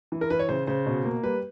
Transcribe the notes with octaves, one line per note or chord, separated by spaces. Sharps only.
E3
A#4
E3 B4
C#5
C#3 C5
C#3 C5
B2
A#3
G3 B4